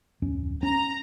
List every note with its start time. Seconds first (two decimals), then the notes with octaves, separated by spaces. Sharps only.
0.22 D1 F2 C#4
0.63 C#4 A#5